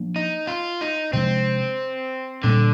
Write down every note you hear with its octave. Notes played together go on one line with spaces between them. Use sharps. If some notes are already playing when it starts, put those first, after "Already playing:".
Already playing: F3 A#3 D4
D#4
F4
D#4
C3 F3 G#3 C4 D4
A#2 D3 G3 A#3